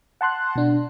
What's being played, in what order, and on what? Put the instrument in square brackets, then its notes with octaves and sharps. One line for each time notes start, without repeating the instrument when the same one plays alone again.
[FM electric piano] F#5 A5 C6 F#6
B2 D4